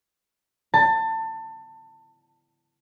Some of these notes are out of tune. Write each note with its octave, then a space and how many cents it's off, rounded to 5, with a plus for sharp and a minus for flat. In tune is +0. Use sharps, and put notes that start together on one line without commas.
A5 +25